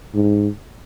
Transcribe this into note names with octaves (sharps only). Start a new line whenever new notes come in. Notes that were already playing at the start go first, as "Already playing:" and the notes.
G#2